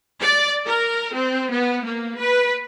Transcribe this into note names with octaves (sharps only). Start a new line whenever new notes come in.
D5
A#4
C4
B3
A#3
B4